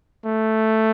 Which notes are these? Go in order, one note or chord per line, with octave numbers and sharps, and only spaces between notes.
A3